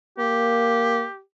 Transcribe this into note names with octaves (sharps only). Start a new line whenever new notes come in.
A#3 G4